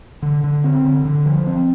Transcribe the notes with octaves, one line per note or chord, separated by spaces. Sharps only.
D3
D3
C4
D3
D3
F3
C4